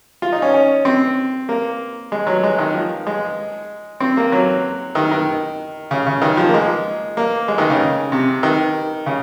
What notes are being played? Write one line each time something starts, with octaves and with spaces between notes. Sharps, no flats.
F4
D#4
C#4
C#4
C4
A#3
G#3
F#3
G#3
D#3
F3
G#3
C4
A#3
F#3
D#3
D#3
C#3
C#3
D#3
F3
A#3
G#3
A#3
G#3
D#3
C#3
C3
D#3
C#3